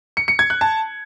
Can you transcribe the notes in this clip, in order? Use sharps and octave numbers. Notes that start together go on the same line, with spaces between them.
C#7
C#7
G#6
F#6
A5